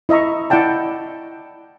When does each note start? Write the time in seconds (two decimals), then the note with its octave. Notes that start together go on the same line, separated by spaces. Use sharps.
0.09 E4 D#5 E5 A#5 C#6
0.50 E4 D5 F#5 G5 A5